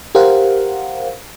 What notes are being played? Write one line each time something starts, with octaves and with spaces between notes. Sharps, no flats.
G4 A#4 C5 F5 F#5